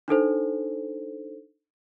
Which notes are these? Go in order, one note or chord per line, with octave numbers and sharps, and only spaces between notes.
D4 D#4 A4 C5